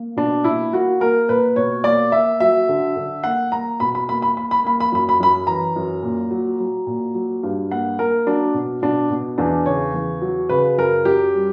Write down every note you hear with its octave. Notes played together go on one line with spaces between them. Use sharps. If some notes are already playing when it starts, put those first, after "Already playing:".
Already playing: A#3
B2 D4
A#2 E4
A#3 F#4
A#3 A#4
A#2 B4
B2 C#5
A#3 D5
A#3 E5
F#3 E5
D3
D3
A#3 F#5
A#3 A#5
B2 B5
B5
A#3 B5
B5
A#3 B5
B5
A#3 B5
B5
F#2 B5
B5
F#2 B5
E3 A#5
F#2
A#2
F#3
F#3
A#2
F#3
G2
A#3 F#5
A#3 A#4
F#3 D4
B2
B2 D4
B2
E2 D4
C#3 C#5
E2
F#3
C#3 B4
F#2 A#4
F#2 G4
G3